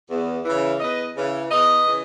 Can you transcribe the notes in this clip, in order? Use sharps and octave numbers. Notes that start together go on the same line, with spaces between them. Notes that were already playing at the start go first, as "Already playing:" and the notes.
E2
C#3 E3
E2 B4 D#5
C#3 E3
E2 B4 D#5
C#3 E3